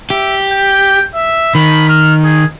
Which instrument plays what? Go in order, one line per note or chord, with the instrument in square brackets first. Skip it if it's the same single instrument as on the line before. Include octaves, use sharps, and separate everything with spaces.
[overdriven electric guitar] G4 [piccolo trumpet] E5
[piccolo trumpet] G5
E5
[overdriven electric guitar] D#3 [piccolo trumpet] B5
[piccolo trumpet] F6
G#4